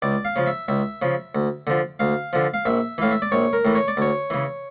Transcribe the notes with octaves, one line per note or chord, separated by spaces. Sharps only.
C#2 D5
F5
C#3 F3
E5
C#2 E5
C#3 F3
D2
D3 F3
D2 F5
D3 F3
F5
A#1 E5
A2 E3 F5
E5
D5
A#1 C#5
A#4
A2 E3
C#5
D5
D2 C#5
C#3 E3